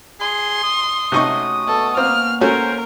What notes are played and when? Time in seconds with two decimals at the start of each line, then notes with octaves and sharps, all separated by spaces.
0.20 G#4 C6
0.63 D#6
1.12 C3 A3 C#4 D#4 F#4 C#6
1.67 B2 A4
1.97 A#3 C4 F6
2.41 A3 C#4 F#4 A#4 C5